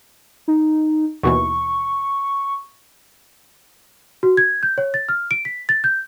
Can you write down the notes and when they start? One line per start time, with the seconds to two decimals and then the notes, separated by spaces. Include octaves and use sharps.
0.48 D#4
1.23 D#2 B2 E3 C#6
4.23 F#4
4.37 G#6
4.63 G6
4.78 C#5
4.94 A6
5.09 F6
5.31 D7
5.45 B6
5.69 A6
5.84 G6